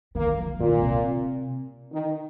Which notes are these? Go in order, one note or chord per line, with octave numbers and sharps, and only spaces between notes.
D#3 A#3
F3
A#2 D#3
C3
D#3